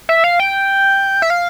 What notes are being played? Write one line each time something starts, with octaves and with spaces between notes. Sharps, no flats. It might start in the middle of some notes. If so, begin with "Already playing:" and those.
E5
F5
G5
E5
F5